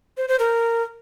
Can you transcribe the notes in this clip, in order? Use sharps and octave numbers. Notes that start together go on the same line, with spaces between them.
C5
C5
A#4